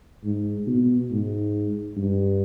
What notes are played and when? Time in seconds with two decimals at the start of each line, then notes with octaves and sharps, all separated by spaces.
0.24 G#2
0.67 B2
1.11 G#2
1.97 G2